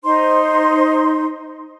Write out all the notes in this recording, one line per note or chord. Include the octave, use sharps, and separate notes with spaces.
D#4 C5 C6